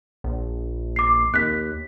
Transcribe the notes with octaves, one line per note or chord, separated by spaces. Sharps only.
A#1
D6 C7
D#2 F#6 B6